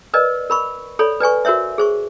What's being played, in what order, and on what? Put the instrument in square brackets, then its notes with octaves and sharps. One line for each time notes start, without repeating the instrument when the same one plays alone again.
[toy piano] A#4 B4 D5 D#5
A#4 B5 C#6
A4 C#5 D5 B5
B4 D5 G#5 C#6
F#4 A#4 C5 C#5 E5
G#4 C5 C#6